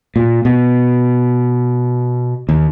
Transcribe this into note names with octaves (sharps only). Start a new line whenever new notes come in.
A#2
B2
D#2